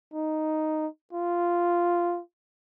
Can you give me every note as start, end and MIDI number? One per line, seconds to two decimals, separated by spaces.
0.14 0.87 63
1.13 2.20 65